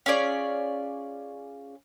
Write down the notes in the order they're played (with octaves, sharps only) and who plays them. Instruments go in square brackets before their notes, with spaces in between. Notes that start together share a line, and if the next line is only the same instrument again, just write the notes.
[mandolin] C#4 F4 G#4 D5